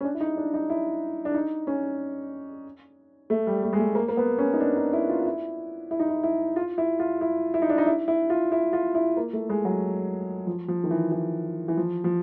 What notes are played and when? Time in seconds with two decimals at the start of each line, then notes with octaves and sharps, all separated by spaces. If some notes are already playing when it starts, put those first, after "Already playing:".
0.01 C#4
0.05 D4
0.14 E4
0.20 D#4
0.37 D4
0.54 D#4
0.70 E4
1.25 D4
1.34 D#4
1.67 C#4
3.30 A3
3.47 G3
3.63 A3
3.73 G#3
3.79 A3
3.95 A#3
4.08 A#3
4.17 B3
4.38 C#4
4.54 D#4
4.60 D4
4.77 D#4
4.93 E4
5.09 F4
5.20 F4
5.26 E4
5.91 E4
6.00 D#4
6.09 E4
6.23 E4
6.56 F4
6.78 E4
6.99 F4
7.21 E4
7.54 E4
7.62 D#4
7.69 D4
7.78 D#4
7.86 E4
8.08 E4
8.30 F4
8.52 E4
8.73 F4
8.95 E4
9.17 A#3
9.33 A3
9.49 G#3
9.65 F#3
10.47 F3
10.68 F3
10.84 D#3
10.91 E3
11.12 E3
11.68 E3
11.77 F3
12.04 F3